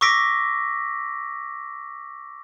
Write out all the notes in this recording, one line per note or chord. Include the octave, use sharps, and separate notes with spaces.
C#6 D6 E6 A#6 B6 D7